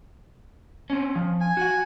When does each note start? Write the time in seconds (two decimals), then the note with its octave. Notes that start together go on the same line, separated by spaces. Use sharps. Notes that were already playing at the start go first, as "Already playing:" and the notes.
0.90 C4 C#4
1.15 F3
1.41 G#5
1.57 F#4 F#5